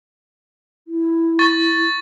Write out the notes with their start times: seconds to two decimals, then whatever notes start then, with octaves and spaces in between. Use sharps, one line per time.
0.88 E4
1.39 C#6 A6